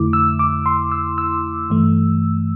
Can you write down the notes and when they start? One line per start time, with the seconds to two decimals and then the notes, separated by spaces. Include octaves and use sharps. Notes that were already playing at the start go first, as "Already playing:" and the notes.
Already playing: F2 D3 A3 E4 D6
0.13 E6
0.39 D6
0.66 C6
0.92 E6
1.18 E6
1.70 G2 E3 A3